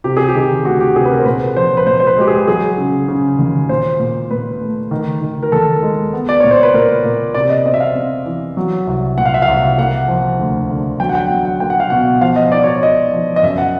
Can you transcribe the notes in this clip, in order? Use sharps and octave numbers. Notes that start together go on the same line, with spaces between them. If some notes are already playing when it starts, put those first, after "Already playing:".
C3 G4
G#4
G4
D#3
D2 F#4
G4
C3 G#4
B4
A#4
C5
A#2 B4
F3 C5
B4
A#2 C5
C5
B4
G#3 G4
G#4
F#3 G#4
C#3
C#3
D#2
A#2 C5
A#2
A#2 B4
A3
D#3
D#3
A#4
D#2 A4
G#3
B3
D5
A#2 C#5
C5
B4
A#2 A#4
A#2
C3 D5
D#5
C4 D#5
E5
F5
C4
E3
F#3
C2
A#2 F#5
F5
E5
F5
C2
A#3 F#5
F3
D2
D3
F#3 G5
F#5
G5
F#3
F#5
A#3 G5
F#5
F5
B2 F#5
F3 F5
D#5
D#4 D5
C#5
D5
D#4 D#5
F3
D#5
F#2 E5
F#5